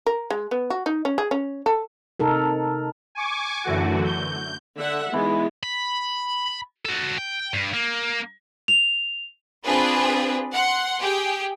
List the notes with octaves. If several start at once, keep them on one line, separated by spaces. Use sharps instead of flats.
A#4
G#3
B3
F#4
D#4
C#4
G#4
C#4
A4
C3 D#4 A4 A#4
G#5 C#6 D6
F#2 D3 E3 A3 F#4
G6
D3 E5 F#5
E3 G#3 B3
B5
F#4 A4
G5
G2
A#3
F7
C4 D4 F4 G#4 B4
F#5 C6
G4 G#4 G5